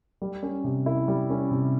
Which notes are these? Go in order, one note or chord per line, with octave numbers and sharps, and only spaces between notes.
G3
C#4
C3
E4
G3
C#4
C3